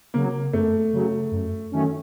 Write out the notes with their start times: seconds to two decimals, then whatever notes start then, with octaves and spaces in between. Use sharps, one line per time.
0.14 C#3 F#3 A#3
0.53 F#2 A3
0.93 C#3 F#3
1.31 F#2
1.72 D#3 F#3 A3 C#4